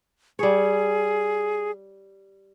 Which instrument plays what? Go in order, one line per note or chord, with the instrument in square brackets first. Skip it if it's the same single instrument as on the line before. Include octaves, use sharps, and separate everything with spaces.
[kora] G3 C#5 [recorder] G#4